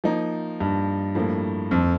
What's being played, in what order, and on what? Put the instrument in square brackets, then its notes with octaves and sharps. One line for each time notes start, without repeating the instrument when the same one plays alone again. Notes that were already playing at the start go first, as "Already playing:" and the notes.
[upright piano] F3 A#3 D#4
[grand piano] G2
[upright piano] A2 F3 A#3
[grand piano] F2